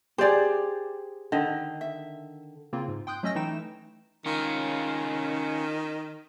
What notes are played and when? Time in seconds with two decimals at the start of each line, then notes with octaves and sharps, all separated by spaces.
0.18 G4 G#4 C5 D5
1.32 D3 D#3 D#5
1.81 E5
2.73 C#3 A#3 C4 F4
2.88 G#2
3.07 G5 C6 D#6 F#6 G6
3.23 F#3 A3 C#4 D#5 E6 A#6
3.35 E3 A3 D#4 E4 G5 E7
4.26 D#3 C#4 F4